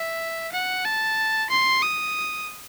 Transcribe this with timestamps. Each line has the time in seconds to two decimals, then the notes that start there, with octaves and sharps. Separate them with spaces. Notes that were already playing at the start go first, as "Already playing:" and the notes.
Already playing: E5
0.52 F#5
0.85 A5
1.50 C6
1.82 D#6